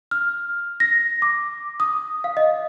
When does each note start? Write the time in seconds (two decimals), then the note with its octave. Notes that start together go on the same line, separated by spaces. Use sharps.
0.11 F6
0.80 A#6
1.22 D6
1.80 D#6
2.24 F5
2.37 D#5